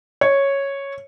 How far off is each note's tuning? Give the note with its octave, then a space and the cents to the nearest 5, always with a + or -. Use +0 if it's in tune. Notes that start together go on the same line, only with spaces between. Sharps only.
C#5 -5